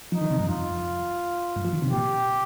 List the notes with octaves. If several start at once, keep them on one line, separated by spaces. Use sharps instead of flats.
F3 D#4
D#3
C3
G2
F2 F4
G2
F3
D#3
C3
A#2 G4